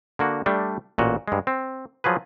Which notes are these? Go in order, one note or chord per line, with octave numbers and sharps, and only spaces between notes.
D3 A#3 F#4
G3 A3 D4
A1 A#2 F#4
G2 G#3
C4
F3 F#3 G#4 B4